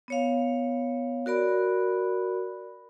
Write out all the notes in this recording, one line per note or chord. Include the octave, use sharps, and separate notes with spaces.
B3 C#5 F5
F#4 A#4 D5 B5